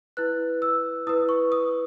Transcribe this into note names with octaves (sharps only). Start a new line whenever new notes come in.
E4 B4 F#6
E6
E4 B4 D#6
C#6
D#6